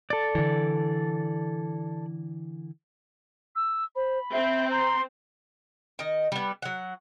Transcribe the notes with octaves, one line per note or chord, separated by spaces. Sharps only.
A4 D5
D3 E3
E6
C5 B5
C4 E5
A#5 C6
D#3 D#5
G3 B3
F#3 F#5